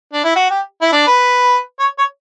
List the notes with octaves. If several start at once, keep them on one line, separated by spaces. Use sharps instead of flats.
D4
E4
F#4
G4
E4
D4
B4
C#5
C#5